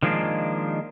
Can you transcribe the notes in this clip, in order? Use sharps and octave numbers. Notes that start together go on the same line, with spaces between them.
D#3 F3 G#3 A#3 D4